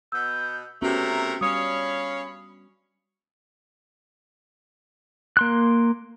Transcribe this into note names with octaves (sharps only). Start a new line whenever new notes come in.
B2 B3 E6 G6
C3 A3 B3 C#4 F#4 A#4 A#5
G3 C#4 C#5 F5 B5 D#6
A#3 C6 F#6